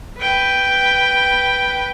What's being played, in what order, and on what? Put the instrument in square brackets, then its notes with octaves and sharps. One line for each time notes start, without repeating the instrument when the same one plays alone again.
[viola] B4 G5